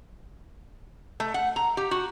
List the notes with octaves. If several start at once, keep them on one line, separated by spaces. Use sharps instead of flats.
A3
F#5
A#5
G4
F#4